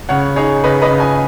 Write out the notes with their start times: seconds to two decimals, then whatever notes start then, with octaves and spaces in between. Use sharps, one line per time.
0.09 C#3 C#5 F#5
0.36 D#4 G#4 C#5
0.64 C#3 B4 D#5
0.82 B4 D#5
0.91 C#3
1.00 D#5 G#5